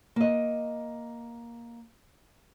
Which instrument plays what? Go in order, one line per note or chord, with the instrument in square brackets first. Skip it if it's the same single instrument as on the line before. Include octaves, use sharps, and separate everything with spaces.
[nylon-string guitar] A#3 D#5